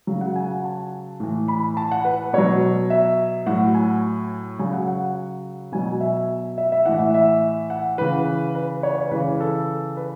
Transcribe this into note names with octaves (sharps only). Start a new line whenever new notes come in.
C#3 F#3
F#5
G#5
F#5
A5
A2 E3
B5
A5
F#5
B4
B2 F#3 C#5
E5
A2 F#3 F#5
G#5
C#3 F#3 G#5
F#5
F#5
B2 F#3 G#5
G#5
E5
E5
E5
A2 E3 F#5
E5
E5
F#5
C#3 E3 B4
B4
C#5
C#5
C#3 E3 B4
A4
B4